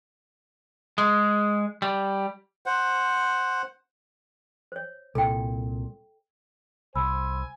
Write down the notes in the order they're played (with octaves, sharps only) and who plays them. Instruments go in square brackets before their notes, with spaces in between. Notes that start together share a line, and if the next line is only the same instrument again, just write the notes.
[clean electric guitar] G#3
G3
[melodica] C5 F#5
[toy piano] C5 C#5
[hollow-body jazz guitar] C2 A#2 [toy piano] A4 G5
[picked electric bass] C2 [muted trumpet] C5 [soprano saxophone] G#5 [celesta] B5 E6